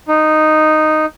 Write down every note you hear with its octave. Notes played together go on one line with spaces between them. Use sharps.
D#4